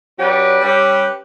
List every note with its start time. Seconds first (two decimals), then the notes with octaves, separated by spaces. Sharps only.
0.18 F#3 C#4 G4 B4 D5
0.61 G3 C#4 G4 B4